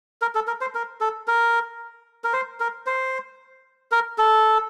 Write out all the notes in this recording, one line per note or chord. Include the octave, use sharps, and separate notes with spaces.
A#4
A4
A#4
C5
A#4
A4
A#4
A#4
C5
A#4
C5
A#4
A4